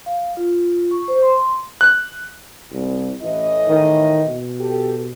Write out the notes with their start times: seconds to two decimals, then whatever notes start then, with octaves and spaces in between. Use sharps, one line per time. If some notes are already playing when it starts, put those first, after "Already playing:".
0.06 F5
0.37 F4
0.91 C#6
1.08 C5
1.22 C6
1.81 F#6
2.71 C2
3.22 A1 A2 E3 D#5
3.68 D#3
4.26 B2
4.59 G4 A4